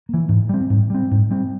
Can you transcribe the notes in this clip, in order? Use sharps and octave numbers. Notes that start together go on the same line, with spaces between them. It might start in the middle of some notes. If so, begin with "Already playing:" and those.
E3 A#3
G#2
G3 C4
G#2
G3 C4
G#2
G3 C4